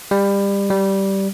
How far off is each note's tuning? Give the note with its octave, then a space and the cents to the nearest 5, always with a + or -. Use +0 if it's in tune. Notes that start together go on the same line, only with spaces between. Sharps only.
G3 +25
G3 -10